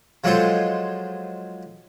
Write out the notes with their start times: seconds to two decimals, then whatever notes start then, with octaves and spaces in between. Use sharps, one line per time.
0.24 F3 F#3 G#3 F4 A4 C5